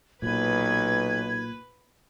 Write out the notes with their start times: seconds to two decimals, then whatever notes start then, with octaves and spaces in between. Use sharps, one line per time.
0.22 B1 A#2 B4 G#6